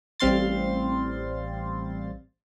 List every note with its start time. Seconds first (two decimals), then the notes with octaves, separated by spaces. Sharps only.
0.20 A1 G3 C4 F5 C6 A6